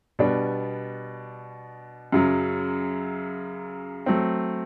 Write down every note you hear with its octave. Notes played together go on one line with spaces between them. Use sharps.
B2 G3 B3 D4
F#2 C#3 F#3
F#3 A3 C4